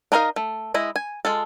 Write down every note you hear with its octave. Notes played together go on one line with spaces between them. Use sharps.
D4 D#4 A#4 D#5 F5
A3
G#3 E4 D#5
G#5
G#3 F4 A4